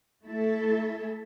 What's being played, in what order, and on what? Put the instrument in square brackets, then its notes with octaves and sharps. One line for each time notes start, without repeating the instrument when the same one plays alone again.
[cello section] A3 E4 A4 E5